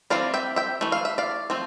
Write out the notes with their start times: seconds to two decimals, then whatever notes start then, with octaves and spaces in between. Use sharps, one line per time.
0.10 E3 G3 C4 D5 F5
0.34 E5 G5
0.56 E5 G5
0.81 E3 A3
0.92 F5
1.05 E5
1.18 D5 F5
1.50 F3 A3 C4